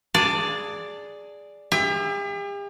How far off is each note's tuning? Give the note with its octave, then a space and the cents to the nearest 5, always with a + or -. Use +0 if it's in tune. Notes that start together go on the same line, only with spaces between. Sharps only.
G#4 +0 D5 +0 A5 +30
G4 +45 E5 +0